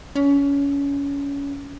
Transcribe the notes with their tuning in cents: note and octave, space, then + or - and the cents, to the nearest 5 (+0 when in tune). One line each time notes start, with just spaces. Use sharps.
C#4 +25